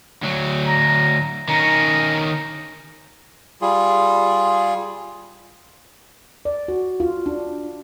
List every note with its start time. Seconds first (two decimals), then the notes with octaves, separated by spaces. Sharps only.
0.22 D2 F#3
0.66 A#5
1.48 D#3 C#4 A#5
3.61 G3 F4 G#4
6.45 D5
6.68 F#4
7.00 F4
7.26 D4